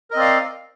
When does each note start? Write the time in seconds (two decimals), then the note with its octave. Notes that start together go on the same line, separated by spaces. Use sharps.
0.11 A#4
0.13 D#5
0.16 C4
0.18 D5
0.21 F5